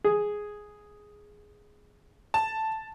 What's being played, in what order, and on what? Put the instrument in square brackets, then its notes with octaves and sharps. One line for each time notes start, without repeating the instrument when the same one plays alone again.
[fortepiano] G#4
[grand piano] A5